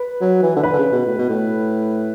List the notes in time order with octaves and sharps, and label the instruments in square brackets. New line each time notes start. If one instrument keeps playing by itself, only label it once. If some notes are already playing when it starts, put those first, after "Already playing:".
Already playing: [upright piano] B4
[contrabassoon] F#3
E3
D3
[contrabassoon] E3 [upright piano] B4
[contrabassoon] D3
C#3
B2
A2
B2
A2